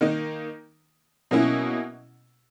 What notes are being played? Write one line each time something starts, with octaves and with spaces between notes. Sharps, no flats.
D#3 A#3 D#4
B2 F#3 A#3 C#4 E4